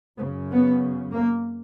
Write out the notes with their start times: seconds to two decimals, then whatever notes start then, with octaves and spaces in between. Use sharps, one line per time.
0.19 F#2 C#3 B3
0.51 B3
1.12 A#3